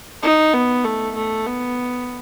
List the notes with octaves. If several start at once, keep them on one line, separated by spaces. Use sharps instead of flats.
D#4
B3
A3
A3
B3